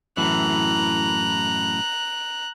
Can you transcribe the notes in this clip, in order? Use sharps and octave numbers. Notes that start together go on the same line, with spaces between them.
F#2 A2 E3 A#5 F#6